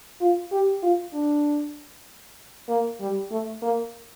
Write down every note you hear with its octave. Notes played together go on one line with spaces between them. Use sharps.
F4
G4
F4
D4
A#3
G3
A3
A#3